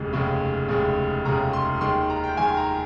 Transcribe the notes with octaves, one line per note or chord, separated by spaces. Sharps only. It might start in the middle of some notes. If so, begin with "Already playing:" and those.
Already playing: F1 D#2 C#3 G#3
F1 D#2 C#3 G#3
F1 D#2 C#3 G#3
F1 D#2 C#3 G#3 A#5
C6
D#2 D#3 G#3 C6
A#5
G5
D#2 D#3 G#3 G#5
A#5